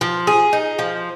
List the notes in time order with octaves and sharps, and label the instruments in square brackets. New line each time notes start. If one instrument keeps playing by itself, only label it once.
[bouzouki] F3
G#4
D#4
F3